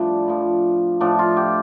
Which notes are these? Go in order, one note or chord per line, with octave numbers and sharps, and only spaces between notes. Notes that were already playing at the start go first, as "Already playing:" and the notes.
Already playing: A2 F3 G3 D4
A2 F3
A2 F3 D4
F4
G4